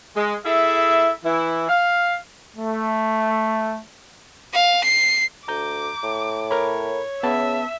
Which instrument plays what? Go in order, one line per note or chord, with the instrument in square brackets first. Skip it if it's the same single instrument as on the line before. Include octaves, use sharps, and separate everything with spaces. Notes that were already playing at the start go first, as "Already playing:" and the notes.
[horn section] G#3
E4 G#4 A4 E5
E3 E4
F5
[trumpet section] A3
[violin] F5
C7
[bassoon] D2 [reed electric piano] A#5 G6 [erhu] D6
[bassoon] A2
[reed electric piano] A#4 B5 [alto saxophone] C#5
[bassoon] C#3 [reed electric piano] B3 A5 [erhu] E5